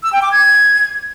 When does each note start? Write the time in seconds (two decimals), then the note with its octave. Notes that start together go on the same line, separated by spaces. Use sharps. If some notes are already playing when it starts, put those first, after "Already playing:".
0.03 E6
0.13 G5
0.22 D6
0.32 G#6